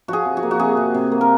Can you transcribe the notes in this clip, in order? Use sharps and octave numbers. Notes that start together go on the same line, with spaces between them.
F3 F#4 G#4
C3
F#4
A#3
F#4
C3 G#4
C3
C3
A#3
A#4